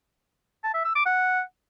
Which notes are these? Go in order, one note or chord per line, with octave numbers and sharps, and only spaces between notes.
A5
E5
E6
D6
F#5